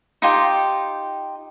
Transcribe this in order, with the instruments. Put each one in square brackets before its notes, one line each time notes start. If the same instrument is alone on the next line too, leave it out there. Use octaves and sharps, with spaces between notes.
[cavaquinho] D#4 F4 G4 G5